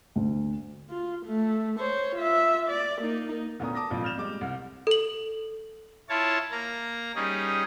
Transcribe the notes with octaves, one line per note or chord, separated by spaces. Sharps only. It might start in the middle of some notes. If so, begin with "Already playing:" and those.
D2
F4
A3
C5 C#5
F4 E5
D5
A#3 D#4
D2 A#2 B3 C#4 A#5 D#6
A5 D6 D#6 A#6
G#1 F2 A#2 F3
F6 G6 E7 F7
G3 G#3 D6
C2
A4 F#7
E4 F4 C#5 A5
A#3 A#5
G3 C#4 D#4 G#4